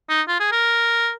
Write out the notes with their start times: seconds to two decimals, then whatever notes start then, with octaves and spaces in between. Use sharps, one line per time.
0.09 D#4
0.28 F4
0.40 G#4
0.52 A#4